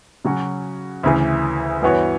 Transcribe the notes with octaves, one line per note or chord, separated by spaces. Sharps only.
C#3 F#3 C#4 F#4
D2 C#3 E3
G2 E3 B3 F#4 C#5